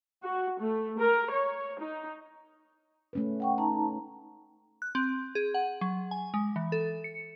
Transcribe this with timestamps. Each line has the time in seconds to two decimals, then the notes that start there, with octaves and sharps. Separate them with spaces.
0.22 F#4
0.59 A3
0.99 A#4
1.31 C#5
1.80 D#4
3.13 A3 C#4 B4
3.40 F#5 G5 C#6
3.58 D#4 A5 A#5
4.82 F#6
4.95 C4
5.35 G#4
5.54 F#5
5.81 F#3
6.11 G#5
6.34 G#3
6.56 E3
6.72 A4
7.04 C#7